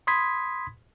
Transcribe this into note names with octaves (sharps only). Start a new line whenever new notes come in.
B5 C6 D#6 G#6 B6